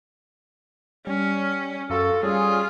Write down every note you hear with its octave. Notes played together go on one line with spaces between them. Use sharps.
G3 C#4
F#2 F4 F#4 A4
G3 C#4 F4 G#4